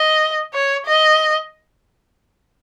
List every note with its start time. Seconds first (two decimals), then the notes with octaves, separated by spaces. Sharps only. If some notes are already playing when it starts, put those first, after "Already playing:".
Already playing: D#5
0.54 C#5
0.86 D#5